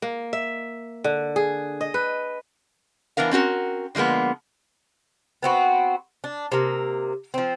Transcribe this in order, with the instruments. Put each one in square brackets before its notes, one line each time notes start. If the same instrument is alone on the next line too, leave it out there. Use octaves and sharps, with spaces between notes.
[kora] A#3
E5
D3
G#4
D#5
B4
[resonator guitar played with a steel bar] E3 B3 D4 A#4 F5
C4 C#4 F#4 A#4
D3 F3 G#3 A#3 B3
[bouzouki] B3 C4 F#4 B4
D4
C3 A#3
F3 C4